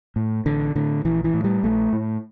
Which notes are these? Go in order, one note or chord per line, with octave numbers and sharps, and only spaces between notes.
A2
A1 D3
A2 D3
A#1 E3
E3
A2
G3
A#1 A3
A2